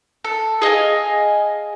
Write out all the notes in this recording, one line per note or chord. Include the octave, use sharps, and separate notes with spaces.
A4
G#4 D#5 F5 G#5